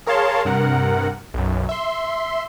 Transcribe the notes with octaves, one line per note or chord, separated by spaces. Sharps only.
G#4 A#4 C#5 F5 A5 C6
G2 C3 A#4 F#5
B1 F#2
E5 C6